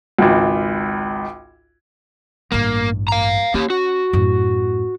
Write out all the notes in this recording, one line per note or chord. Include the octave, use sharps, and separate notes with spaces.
G#1 C#2
A1 G2 A#3
F5 A#5
A#3 C#4 G4
F#4
F#2 A2